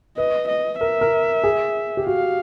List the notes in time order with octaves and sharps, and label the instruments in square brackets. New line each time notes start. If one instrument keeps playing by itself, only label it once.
[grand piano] B4 [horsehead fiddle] D#5
[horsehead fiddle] D#5
[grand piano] A#4 [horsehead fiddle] E5
[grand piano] A#4
G#4
G4
[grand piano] F#4 [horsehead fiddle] F5